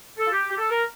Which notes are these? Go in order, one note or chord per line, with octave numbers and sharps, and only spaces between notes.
A4
F4
G4
G4
A4
A#4